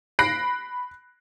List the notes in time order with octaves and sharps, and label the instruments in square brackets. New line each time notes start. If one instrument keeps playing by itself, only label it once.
[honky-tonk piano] B5 F#6 A#6 C7 D7